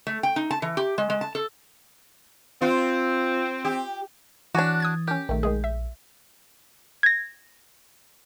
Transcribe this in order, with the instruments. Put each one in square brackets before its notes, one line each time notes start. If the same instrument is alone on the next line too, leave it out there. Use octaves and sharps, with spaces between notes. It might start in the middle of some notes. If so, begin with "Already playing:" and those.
[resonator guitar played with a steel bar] A3
G5
D#4
A5
E3
G4
G#3
G#3
A5
A4
[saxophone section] C4 [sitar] F4
[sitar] G4
[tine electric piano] E3 [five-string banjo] D4 F#4 [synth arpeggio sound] C#5 G#5 D6
[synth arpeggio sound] D#6 G#6 A6
[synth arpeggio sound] C#4 A#4 [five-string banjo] G4
[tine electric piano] A#1 [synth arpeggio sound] D#3 A3
[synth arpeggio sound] D#3 G#3 G#4
E5
G#6 A#6